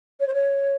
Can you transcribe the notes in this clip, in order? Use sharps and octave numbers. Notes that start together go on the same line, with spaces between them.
C#5
C5
C#5